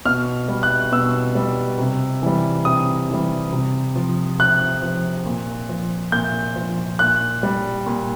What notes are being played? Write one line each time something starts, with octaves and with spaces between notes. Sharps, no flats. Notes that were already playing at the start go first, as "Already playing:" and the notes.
B2 F6
G3
F#6
B2 E6
G3
C3
E3 G3
C3 D#6
E3 G3
C3
F3
C3 F#6
F3
A#2
F3
A#2 G6
F3
A#2 F#6
G3
A#2